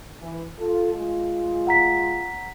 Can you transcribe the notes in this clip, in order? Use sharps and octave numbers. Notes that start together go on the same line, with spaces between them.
E3
F4 A4
G#3 F4
F#5 A#5 B6